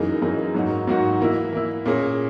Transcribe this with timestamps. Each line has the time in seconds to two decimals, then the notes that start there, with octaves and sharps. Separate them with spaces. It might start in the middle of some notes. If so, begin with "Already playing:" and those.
Already playing: F#2 E3 A#3 D#4 G#4
0.22 F#2 E3 A#3 D#4 G#4
0.54 G#2 F#3 A#3 D#4 F#4
0.87 G#2 F#3 A#3 D#4 F#4
1.20 E3 A#3 E4
1.52 E3 A#3 E4
1.86 A#2 A#3 C#4 G#4